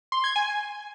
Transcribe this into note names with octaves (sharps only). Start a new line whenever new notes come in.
C6
G#6
G#5